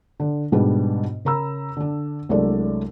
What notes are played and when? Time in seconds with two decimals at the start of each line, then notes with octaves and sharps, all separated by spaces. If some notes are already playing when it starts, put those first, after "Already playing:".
0.20 D3
0.52 G#2 B2 G3 B3 D4 G#4
1.25 C#3 A#4 A#5 B5 E6
1.77 D3 D4
2.29 C2 F#3 G#3 A3 D4 D5